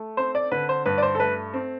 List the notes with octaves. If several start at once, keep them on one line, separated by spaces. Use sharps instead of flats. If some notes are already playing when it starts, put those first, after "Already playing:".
Already playing: A3
C4 C5
D5
D3 B4
C5
G2 B4
D5
C5
A4
A3 B4
C4